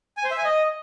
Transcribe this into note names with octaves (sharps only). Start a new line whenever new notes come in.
G#5
C5
E5
G#5
D#5